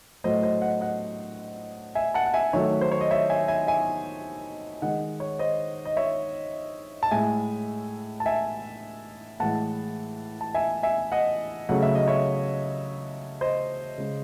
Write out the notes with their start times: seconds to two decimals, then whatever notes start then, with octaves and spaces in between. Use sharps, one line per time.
0.24 A2 F#3 A3 C5 D#5
0.43 C5 D#5
0.62 D#5 F#5
0.81 D#5 F#5
1.95 E5 G#5
2.14 F#5 A5
2.26 F#5
2.34 E5 G#5
2.53 D#3 F#3 A3 C#5 E5
2.81 C5
2.92 C#5
3.01 D#5
3.11 C#5 E5
3.29 E5 G#5
3.48 E5 G#5
3.67 E5 G#5
4.82 D#3 G#3 D#5 F#5
5.20 C#5
5.39 C5 D#5
5.85 D#5
5.97 C#5 E5
7.03 A5
7.11 A2 G#3 E5 G#5
8.20 A5
8.26 E5 G#5
9.40 A2 E3 G#3 F#5 A5
10.41 A5
10.55 E5 G#5
10.83 E5 G#5
11.12 D#5 F#5
11.69 C#3 F#3 A3 F#5
11.82 E5
11.95 D#5
12.08 C#5 E5
13.41 C5 D#5
13.98 C#3 G#3